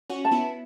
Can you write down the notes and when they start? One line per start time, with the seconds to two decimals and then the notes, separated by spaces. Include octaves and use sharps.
0.10 C#4 F#4
0.25 A5
0.31 B3 E4